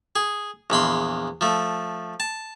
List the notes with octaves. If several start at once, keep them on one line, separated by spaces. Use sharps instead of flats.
G#4
A#1 E2 B5 C6
F3 A3
A5